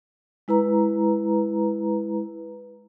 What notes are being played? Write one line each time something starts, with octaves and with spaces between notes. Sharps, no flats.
G#3 E4 B4 A#5